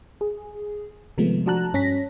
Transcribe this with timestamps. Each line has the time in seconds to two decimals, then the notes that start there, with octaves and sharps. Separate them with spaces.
0.21 G#4
1.18 C3 D#3 F3 G#3 A3 B3
1.46 F3 D4 F#4 A5 A#5 F#6
1.74 G2 C#4 A#6 B6